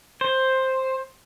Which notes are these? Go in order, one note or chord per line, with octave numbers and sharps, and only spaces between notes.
C5